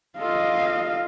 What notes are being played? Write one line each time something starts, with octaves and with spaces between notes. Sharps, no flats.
F4 A4 D#5 F5